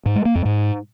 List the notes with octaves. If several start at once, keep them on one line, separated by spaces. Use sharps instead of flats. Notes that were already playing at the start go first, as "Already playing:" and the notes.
G#2
G#3
A#3
F2
G#2